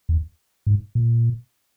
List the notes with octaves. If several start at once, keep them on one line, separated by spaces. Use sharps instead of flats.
E2
G#2
A#2